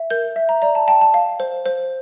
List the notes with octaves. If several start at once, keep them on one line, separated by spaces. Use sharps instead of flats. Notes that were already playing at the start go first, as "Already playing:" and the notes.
Already playing: E5
A#4 G6
E5
A#5
D5 A#5
A5
G5 A5
A5
F5
C5
C5